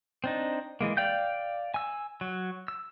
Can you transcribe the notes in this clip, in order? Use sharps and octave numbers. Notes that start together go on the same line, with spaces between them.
C4 D4 D#4
E3 G#3 A#3
D5 F5 G5 G6
G#5 E6
F#3
E6